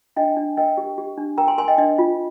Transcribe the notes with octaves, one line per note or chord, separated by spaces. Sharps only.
D4 D#5 G5
D4
A#4 D#5 G5
G4
G4
D4
A#4 G5 A#5
G#5 C6
A#4 G#5 C6
D#5 G5
D4 D#5
F4